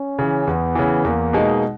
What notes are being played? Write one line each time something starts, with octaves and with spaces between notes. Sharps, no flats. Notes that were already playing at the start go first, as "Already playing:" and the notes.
Already playing: C#4
C#3 E3
E2 B3
C#3 E3
E2 A#3
B2 G#3 D#4